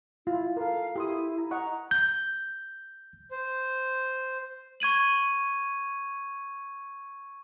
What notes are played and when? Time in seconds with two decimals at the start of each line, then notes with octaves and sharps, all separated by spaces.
0.27 E4 F4
0.57 A4 A#4 F5
0.96 E4 G4 C6 D#6
1.38 A#5
1.51 D#5 F#5 A#5 C#6
1.91 G6
3.31 C5
4.80 C#6 G#6 D#7 F#7